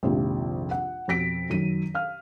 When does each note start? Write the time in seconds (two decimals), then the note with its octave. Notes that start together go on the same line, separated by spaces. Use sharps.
0.03 A#1 F2 G#2 C3 D#3 F3
0.71 F#5
1.08 F2 B2 A#6 B6 D7
1.50 F#2 D#3 F#3 D#7
1.94 F5 F6